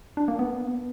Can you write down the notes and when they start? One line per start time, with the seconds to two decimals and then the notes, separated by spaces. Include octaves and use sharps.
0.17 D4
0.28 A#3
0.39 B3